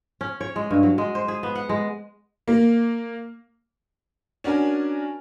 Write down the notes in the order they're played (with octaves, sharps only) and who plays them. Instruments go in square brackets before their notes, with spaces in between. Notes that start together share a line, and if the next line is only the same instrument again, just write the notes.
[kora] C#4
C#5
G#3
G2
F#3
G#3
C5
G#4
B3
F#5
G#3
[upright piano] A#3
C#4 D4 F#4 A#4 G#5